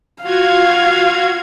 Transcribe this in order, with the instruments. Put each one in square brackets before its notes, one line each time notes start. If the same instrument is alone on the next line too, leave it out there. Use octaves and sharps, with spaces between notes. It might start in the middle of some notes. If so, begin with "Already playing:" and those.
[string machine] F4 F#4 G#6 [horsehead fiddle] F5